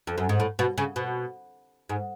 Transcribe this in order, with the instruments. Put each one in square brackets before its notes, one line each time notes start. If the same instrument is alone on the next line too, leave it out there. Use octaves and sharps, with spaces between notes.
[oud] F2
F#2
G#2
A2
B2
C#3
B2
G#2